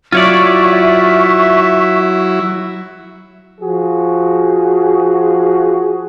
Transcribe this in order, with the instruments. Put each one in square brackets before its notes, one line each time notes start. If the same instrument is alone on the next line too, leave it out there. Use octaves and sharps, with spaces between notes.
[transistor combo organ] F#3 E4 [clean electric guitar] F4 C#5 D5 [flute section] E5 C#6
[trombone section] F3 F#4 G#4